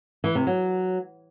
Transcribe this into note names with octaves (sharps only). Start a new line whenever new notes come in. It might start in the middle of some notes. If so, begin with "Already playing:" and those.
E3
C3
F#3